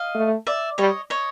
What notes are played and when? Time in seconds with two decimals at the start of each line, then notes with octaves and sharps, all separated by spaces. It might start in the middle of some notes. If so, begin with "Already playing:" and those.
Already playing: D#5 F5
0.15 A3
0.47 D5 E5
0.78 G3 C#5 D#5
1.10 C#5 D#5